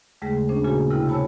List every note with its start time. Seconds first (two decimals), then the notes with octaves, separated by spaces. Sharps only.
0.22 D#2 C#3 G#3 A3 G#4 A#6
0.49 C#4 D4 G#4 C5
0.64 A#2 C#3 A#3 F#4 G#4 G#5
0.90 C3 E4 A#4 G5 F6
1.09 C5 C#5 G#5 A5 B5 E6